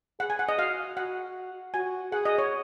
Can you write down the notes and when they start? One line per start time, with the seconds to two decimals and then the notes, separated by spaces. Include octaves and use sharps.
0.20 G#4 F#5
0.30 G#5
0.39 F#5
0.49 D#5
0.58 F#4 F5
0.97 F#4 F#5
1.74 F#4 G#5
2.12 G#4 F#5
2.25 D#5
2.38 C#5